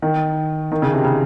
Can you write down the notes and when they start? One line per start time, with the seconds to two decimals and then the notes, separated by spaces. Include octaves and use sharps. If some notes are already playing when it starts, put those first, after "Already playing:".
0.02 D#3
0.72 D#3
0.82 C#3
0.93 C3
1.05 C#3